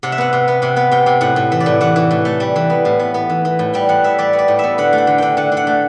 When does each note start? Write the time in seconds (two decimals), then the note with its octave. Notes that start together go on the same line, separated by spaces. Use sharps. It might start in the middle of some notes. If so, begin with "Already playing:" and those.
0.03 C3 F#5
0.12 E5
0.18 B3 F#5
0.33 C3
0.48 B3
0.62 C3 F#5
0.76 B3
0.91 C3 G5
1.06 C3
1.21 A2 F#5
1.36 A2
1.52 E3
1.60 D5
1.66 A2
1.81 E3 F#5
1.96 E3
2.11 A2
2.25 A3
2.40 G3
2.56 E3
2.70 B3
2.85 A2
2.99 B3
3.14 B3
3.29 E3
3.45 E3
3.59 A2
3.74 G3 G5
3.89 A2 F#5
4.04 B3 E5
4.18 G3 D5
4.33 B3
4.39 D5
4.48 A2
4.59 B3 E5
4.78 D3 F#5
4.93 A3
4.98 F#5
5.07 D3
5.18 D3 G5
5.37 D3 F#5
5.52 D3
5.57 F#5
5.67 A3